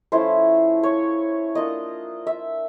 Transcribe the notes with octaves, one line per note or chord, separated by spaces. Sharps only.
F3 A3 C#4 E4 C5
C#5
A#3 D4 F4 D#5
E5